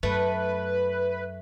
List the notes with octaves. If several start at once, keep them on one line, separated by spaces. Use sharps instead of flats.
F#2 A3 B4